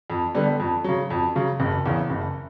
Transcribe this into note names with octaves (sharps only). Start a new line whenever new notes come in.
F2
D3 G3 B3
F2
C#3 F#3
F2
C#3 F#3
F#1
E2 C#3
F#1